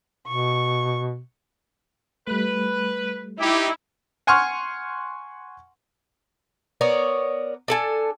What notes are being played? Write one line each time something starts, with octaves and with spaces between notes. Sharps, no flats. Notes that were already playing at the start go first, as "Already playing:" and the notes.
B2 C#6
G3 A3 B4
D#4 E4 G4
F#5 G#5 C6 C#6 F6
B3 A#4 C#5 D5
D4 A4 G#5